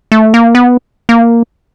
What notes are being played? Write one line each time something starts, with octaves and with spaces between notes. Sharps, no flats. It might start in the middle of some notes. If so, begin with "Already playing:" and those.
A3
A#3
B3
A#3